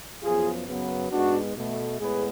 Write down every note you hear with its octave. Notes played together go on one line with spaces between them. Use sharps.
F#2 F3 B3 F4 G#4
F#2 C#3 F#3 B3
G#2 G#3 B3 D4 F#4
B2 A3
A2 G#3 B3 G#4 B4